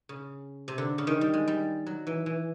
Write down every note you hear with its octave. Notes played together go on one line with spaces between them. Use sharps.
C#3
C3
D3
C#3
D#3
G3
G#3
G3
F#3
E3
E3